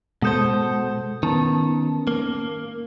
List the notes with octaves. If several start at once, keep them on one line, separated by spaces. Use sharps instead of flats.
B2 G#3 A4 C5 D#6 G6
D#3 B3 C#4 A5
A#3